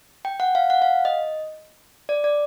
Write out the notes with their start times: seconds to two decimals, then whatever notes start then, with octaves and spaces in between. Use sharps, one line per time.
0.25 G5
0.40 F#5
0.55 F5
0.70 F#5
0.82 F5
1.05 D#5
2.09 D5
2.24 D5